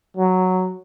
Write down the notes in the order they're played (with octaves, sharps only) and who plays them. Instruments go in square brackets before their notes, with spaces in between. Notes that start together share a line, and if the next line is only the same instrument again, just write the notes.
[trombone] F#3